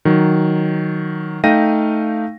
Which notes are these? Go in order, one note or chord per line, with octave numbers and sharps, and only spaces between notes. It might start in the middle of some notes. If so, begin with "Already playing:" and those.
D#3 F#3
A3 D#4 F5 G5 A#6 D#7